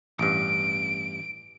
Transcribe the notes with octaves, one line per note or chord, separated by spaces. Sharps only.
A1 G2 D7